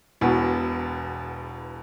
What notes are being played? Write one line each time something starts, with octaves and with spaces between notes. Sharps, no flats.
E1 E2 B2